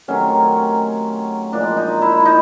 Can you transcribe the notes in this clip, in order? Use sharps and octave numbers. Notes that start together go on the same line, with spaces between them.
C3 D#3 F#3 A3 C#4
A#2 F3 G#3 D4
D#4
E4
D#4